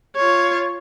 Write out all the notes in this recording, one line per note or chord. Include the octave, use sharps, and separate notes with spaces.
F4 C#5